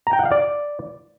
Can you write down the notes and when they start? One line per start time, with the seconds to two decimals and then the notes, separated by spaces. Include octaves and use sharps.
0.07 A#5
0.13 G5
0.19 F#5
0.25 F5
0.32 D5